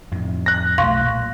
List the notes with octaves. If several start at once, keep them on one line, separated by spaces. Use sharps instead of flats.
F2 A2
F#6 A#6
B1 A3 F5 C6 C#6
A#2